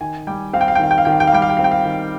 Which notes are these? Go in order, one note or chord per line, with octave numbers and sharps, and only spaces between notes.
D#3 G#5
G3 G5
C4 F5
G5
F5
G5
D#3 F5
G5
F5
D#3 G5
F5
G5
F5
G3 G5
F5
G5
C4 F5
G5
F5
D#3